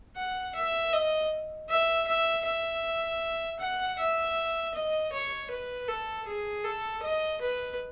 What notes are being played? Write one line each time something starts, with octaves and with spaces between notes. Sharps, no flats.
F#5
E5
D#5
E5
E5
E5
F#5
E5
D#5
C#5
B4
A4
G#4
A4
D#5
B4